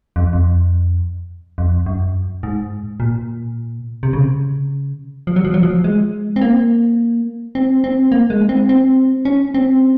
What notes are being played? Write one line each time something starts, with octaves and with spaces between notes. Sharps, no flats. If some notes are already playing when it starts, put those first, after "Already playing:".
F2
F2
F2
F#2
G#2
A#2
C3
C#3
F3
F#3
F3
F#3
F3
G#3
C4
A#3
C4
C4
A#3
G#3
C4
C4
C#4
C4